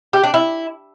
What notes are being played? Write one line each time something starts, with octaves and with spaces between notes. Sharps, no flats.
G4
D4
E4